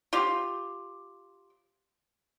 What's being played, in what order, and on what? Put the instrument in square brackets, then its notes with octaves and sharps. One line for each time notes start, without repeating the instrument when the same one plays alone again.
[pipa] F4 G4